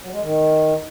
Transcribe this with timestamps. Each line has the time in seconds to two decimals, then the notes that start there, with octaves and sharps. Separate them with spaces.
0.02 F#3
0.11 G#3
0.21 D#3